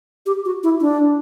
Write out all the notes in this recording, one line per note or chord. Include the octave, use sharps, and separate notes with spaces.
G4
F#4
E4
D4